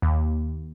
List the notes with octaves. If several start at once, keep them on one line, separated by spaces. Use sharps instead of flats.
D#2